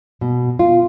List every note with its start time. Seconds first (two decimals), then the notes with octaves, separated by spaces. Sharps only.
0.21 B2
0.59 F4